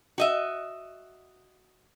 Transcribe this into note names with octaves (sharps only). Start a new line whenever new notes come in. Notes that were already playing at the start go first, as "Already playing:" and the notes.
F#4 D#5 E5